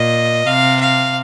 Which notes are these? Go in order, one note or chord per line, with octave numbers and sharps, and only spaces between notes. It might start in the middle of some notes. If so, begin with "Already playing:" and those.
Already playing: A#2 D#5
C3 F5
F5